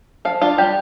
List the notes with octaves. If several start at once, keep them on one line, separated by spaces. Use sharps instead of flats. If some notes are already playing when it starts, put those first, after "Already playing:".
F3 F5
D4 F4
G3 G4